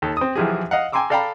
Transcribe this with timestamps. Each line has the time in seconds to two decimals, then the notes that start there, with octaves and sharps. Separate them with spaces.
0.02 D#2 A4
0.17 C4 D#6
0.36 B1 E3 F3 G4 G#4
0.71 D#5 F5 F#5
0.92 G5 G#5 A#5 C6 D6 E6
1.10 A4 D5 F5 G5 A#5 B5